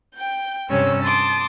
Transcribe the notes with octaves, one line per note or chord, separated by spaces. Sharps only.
G5 G6
G2 C3 C#4 C#5 E6
A5 C6 D6 D#6